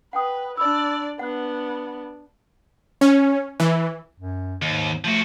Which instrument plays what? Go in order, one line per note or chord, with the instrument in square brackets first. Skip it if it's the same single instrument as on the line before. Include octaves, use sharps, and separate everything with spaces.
[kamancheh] B4 [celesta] F#5 G5 D#6
[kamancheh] D4 D5 [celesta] B5 E6
[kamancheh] B3 D4 [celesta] F#5 F#6
[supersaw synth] C#4
E3
[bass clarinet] F#2
[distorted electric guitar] D#2 [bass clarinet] G#2
[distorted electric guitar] F3 F#4 [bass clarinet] A3